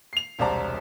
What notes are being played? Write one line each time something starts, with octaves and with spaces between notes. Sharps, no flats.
C7 F7
E1 C2 C5 D5 A5 A#5